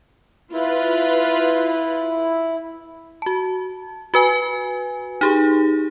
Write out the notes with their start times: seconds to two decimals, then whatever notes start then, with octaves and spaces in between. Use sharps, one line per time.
0.53 E4 F4 B4
3.22 F#4 A5
4.14 F#4 B4 G#5
5.21 D#4 G4 G#4